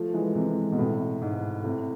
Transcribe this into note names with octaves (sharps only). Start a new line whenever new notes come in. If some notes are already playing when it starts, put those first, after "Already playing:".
Already playing: F3 A3
E3 G#3
C3 E3
B2
A2 C3
G#2
A2 C3